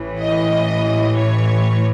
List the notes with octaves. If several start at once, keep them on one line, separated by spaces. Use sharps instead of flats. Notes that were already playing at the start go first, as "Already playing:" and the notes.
Already playing: A1 A2 E3
D#5
C#5